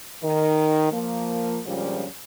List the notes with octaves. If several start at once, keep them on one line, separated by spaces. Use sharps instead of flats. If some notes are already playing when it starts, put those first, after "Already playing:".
D#3
F3 A#3
A#2 D3 F3 G3 G#3 C#4